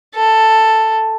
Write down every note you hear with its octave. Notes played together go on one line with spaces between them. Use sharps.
A4